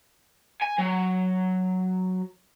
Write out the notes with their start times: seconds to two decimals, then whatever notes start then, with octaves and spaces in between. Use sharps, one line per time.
0.62 G#5
0.79 F#3